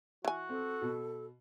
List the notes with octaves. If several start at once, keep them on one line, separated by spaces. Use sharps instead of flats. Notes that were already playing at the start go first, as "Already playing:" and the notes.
E3 F#4 G#5
C4 A4
B2